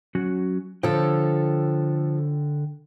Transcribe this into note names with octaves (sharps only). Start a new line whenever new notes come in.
F#3 C#4 F#4
D3 F3 A4 C#5 G5